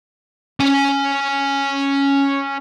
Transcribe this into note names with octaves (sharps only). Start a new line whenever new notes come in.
C#4 G#5